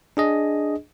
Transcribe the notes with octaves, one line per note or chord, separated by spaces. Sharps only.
D4 G#4 D#5